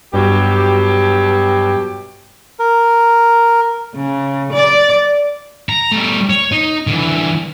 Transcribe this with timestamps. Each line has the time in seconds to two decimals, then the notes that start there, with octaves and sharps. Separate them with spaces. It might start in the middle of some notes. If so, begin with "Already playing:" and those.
0.14 G2 B2 F#3 G4
2.60 A#4
3.95 C#3
4.53 D5
5.69 A#5
5.92 G3 A3
6.30 C#5
6.52 D#4
6.87 D3 E3